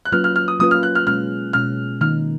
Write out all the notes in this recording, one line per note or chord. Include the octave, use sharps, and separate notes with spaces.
F#6
F#3 A#3 C#4 F4 B4 F6
F6
F6
D#6
F#3 A#3 C#4 F4 B4 D#6
F6
F#6
F6
B2 G#3 C#4 F6
B2 G#3 C#4 F6
D#3 A#3 D#4 F6